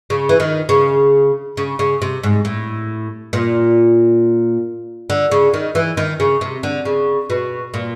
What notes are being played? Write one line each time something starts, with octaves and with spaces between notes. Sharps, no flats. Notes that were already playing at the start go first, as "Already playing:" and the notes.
C#3
E3
D#3
C#3
C#3
C#3
C3
G#2
A2
A#2
D3
C#3
D#3
E3
D#3
C#3
C3
D3
C#3
B2
A#2